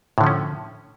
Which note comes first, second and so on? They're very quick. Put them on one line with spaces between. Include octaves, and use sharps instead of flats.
A2 D3 F3 C#4